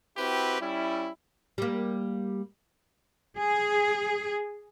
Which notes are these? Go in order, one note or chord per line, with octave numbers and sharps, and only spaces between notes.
C4 E4 F#4 G4 B4
G3 C#4 E4
G3 A#3
G#4